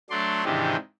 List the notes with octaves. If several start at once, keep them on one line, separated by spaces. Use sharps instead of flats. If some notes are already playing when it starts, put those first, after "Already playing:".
F#3 A3 D4 D5 C6
G#2 C3 D#3 E3 D4 G4